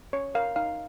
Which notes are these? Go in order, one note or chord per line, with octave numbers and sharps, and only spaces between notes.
C#4 C#5
A#4 C#5 F5
D#4 F5